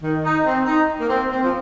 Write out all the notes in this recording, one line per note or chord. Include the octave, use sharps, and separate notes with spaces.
D#3
D#4
C4
D#4
A#3
C4
C4
F3